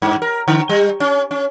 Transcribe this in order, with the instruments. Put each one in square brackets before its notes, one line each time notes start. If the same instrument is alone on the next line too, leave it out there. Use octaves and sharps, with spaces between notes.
[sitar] G2
A#4
D3
G3
C#4
C#4